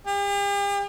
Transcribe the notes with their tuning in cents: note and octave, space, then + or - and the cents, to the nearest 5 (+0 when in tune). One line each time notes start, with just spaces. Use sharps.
G4 +45